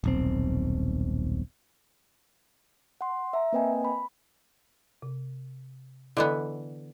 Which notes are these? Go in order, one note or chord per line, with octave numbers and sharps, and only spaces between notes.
D#1 B1 C4
F#5 C6
E5 A#5
A#3 C4 B4 D#5 G5 G#5
B5
C3
D3 E3 B3 E4 A4 D#5